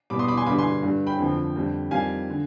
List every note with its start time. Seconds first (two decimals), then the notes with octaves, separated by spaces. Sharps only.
0.10 B2 G3 B5 D6
0.19 C6 D#6
0.28 B5 D6
0.37 G#5 C6
0.47 G2 D3 G3 B5 D6
0.58 G#5 C6
0.83 G2 D3 G3
1.07 G5 B5
1.19 F2 D3 F3
1.56 F2 D3 G3
1.91 F2 D#3 G3 F5 G#5
2.30 D3